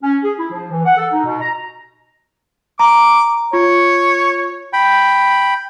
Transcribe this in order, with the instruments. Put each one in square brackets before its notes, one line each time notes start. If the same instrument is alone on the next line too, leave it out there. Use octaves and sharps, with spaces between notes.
[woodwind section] C#4
G#4
E4
F3
E3
F#5
A4
D#4
B2
A#5
[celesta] A#5 [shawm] D6
[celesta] F4 [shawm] C#5
[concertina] G5 B5